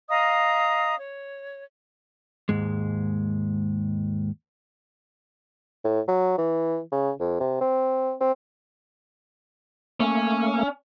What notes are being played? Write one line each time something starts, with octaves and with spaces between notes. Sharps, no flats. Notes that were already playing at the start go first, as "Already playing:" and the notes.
D#5 F5 A#5 D#6
C#5
D#2 G#2 G#3
A2
F#3
E3
C#3
F2
C3
C4
C4
A3 A#3 C#4